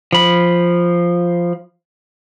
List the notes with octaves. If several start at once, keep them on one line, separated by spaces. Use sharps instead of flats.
F3 B5